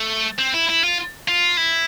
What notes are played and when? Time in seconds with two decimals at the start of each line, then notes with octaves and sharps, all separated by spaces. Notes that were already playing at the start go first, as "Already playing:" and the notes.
Already playing: A3
0.39 C4
0.54 E4
0.69 E4
0.84 F4
1.28 F4
1.57 E4